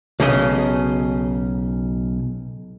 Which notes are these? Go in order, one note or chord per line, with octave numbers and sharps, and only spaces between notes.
B1 C#3 D#5